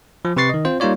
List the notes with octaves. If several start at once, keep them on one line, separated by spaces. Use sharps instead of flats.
F3
C3 B4 C#6 A6 C7
D#3 D#5
C4 F4 C5
G3 A#3 D#4 F4 C#5 D5